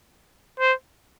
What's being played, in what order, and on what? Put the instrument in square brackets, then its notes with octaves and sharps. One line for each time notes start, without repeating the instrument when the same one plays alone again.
[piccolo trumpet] C5